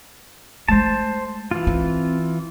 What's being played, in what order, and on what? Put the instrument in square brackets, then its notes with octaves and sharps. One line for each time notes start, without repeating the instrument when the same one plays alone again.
[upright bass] G#3 A3 [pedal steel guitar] C5 A5
[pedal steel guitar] E3 F4
[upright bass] C4